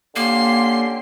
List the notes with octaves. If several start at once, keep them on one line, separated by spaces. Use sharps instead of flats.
D3 A#3 C#4 G4 C6 C7